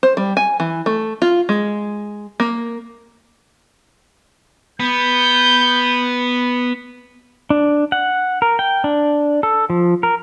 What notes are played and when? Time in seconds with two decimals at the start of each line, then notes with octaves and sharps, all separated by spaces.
0.03 C5
0.17 G3
0.37 G#5
0.60 E3
0.86 A3
1.22 F4
1.49 G#3
2.40 A#3
4.80 B3 G6
7.50 D4
7.92 F#5
8.42 A#4
8.59 G5
8.84 D4
9.43 A4
9.70 F3
10.03 A#4